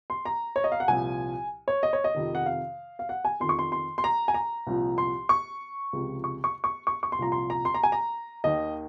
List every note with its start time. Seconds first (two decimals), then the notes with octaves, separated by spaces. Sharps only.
0.10 C6
0.25 A#5
0.56 C#5
0.64 D#5
0.72 F5
0.80 F#5
0.88 C2 A#2 F3 G#5
1.68 C#5
1.83 D#5
1.93 C#5
2.04 D#5
2.14 F2 C3 D#3
2.35 F#5
2.46 F5
2.99 F5
3.09 F#5
3.25 G#5
3.40 F2 D#3 C6
3.49 C#6
3.59 C6
3.72 C6
3.98 C6
4.04 A#5
4.28 G#5
4.34 A#5
4.67 C2 A#2 F3
4.98 C6
5.29 C#6
5.93 C#2 C3 F3
6.24 C#6
6.44 C#6
6.64 C#6
6.87 C#6
7.03 C#6
7.12 C6
7.19 C2 A#2 F3 A#5
7.32 C6
7.50 A#5
7.65 C6
7.74 A#5
7.83 G#5
7.92 A#5
8.44 D#2 D#3 D#5